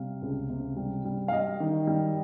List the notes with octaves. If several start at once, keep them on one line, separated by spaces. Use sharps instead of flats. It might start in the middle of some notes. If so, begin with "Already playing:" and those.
Already playing: C3 G3 F5
C#2
C3
G3
G3
F5
G3 D#5
D#3
G3